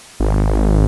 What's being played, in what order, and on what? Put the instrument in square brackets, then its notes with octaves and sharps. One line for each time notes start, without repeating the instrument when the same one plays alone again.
[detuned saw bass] G#1